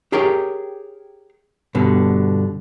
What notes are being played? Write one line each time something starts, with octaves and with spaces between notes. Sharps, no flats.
G4 G#4 A#4 C#5 G5
G2 B2 D3